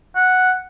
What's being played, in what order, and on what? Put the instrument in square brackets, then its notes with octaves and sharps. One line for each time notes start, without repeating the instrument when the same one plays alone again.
[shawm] F#5